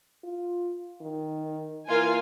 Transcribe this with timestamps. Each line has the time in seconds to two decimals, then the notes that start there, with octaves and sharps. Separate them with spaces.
0.24 F4
1.01 D#3
1.88 E3 A#3 F4 G#5